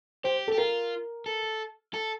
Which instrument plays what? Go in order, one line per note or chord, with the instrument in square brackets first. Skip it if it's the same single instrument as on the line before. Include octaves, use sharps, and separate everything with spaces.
[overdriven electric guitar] G4 [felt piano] C5
[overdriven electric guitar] G4 [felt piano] A4
[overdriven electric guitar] F4 [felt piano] A#4
[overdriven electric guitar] A4
A4